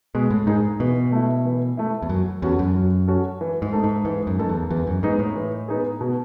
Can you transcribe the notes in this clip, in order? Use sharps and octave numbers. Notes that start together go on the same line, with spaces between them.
B2 G#3
A2
G#2 D#4 G#4
B2 E3
A3 E4
E3
A3 E4
E2
F#2 F#3
E2 C#4 F#4 A4
F#2
F#3
C#4 F#4 A4
E3
G#2
A3 D#4 A4
G#2
G#2 E3
F#2
F#2 A3 D#4 A4
E2
E2 E3
F#2
G#2 B3 D#4 G#4
A2
E3
B3 D#4 G#4
B2